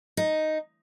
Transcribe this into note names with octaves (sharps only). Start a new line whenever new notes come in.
D#4